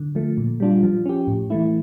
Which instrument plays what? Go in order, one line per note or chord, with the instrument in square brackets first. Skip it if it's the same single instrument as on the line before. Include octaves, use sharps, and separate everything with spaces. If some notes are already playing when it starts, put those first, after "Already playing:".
Already playing: [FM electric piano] D3
F3 A3
A#2
G3 D4 F4
F3
C#4 G4
A2
E3 A3 E4